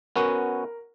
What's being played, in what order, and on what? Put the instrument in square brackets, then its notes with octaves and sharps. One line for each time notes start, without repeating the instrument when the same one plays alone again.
[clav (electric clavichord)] B3 C#4 F#4 [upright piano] A#4